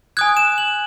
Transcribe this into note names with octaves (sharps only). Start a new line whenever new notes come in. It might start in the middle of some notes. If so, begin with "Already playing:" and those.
G#5 D#6 F#6 G#6
E7
F#7